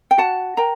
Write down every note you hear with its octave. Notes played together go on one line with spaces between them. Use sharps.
G5
F#4 F#5 A5
A#4 G5 A#5